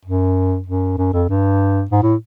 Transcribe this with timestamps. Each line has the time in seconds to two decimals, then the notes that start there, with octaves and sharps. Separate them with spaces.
0.05 F#2
0.67 F#2
0.98 F#2
1.13 F2
1.29 G2
1.90 G#2
2.03 A2